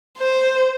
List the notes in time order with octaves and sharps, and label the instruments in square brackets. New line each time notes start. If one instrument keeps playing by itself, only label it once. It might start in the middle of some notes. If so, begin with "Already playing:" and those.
[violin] C5